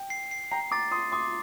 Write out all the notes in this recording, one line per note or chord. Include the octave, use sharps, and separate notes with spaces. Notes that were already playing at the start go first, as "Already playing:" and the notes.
Already playing: G5
C7
C7
G5 A#5 C7
A#5 D6 A6
C6 D#6 C7
C6 D6 D#6